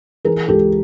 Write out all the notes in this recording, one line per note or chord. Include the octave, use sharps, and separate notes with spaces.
E3 G#4 A#4
C#2 G4 A4